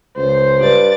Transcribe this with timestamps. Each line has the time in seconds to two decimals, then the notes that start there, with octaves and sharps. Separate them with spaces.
0.17 C#2 C5
0.60 G2 D5 A6